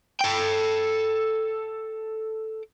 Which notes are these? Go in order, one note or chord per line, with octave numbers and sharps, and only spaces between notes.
A4 G5